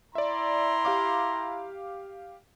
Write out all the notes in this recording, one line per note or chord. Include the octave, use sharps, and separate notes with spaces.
E4 D5 E5 A#5 C6
G4 F5 D6